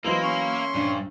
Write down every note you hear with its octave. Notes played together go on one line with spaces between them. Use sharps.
E3 F#3 A#3 E4 A#4 C5 D#5
C#4 C6 C#6
A#1 G2